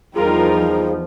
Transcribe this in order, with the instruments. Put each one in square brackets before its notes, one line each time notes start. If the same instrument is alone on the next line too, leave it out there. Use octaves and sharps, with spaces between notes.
[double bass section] E2 F3 [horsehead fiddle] G3 D#4 [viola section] F4 A#4 [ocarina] G#4